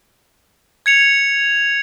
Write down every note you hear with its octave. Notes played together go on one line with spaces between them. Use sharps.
G#6 C#7 F7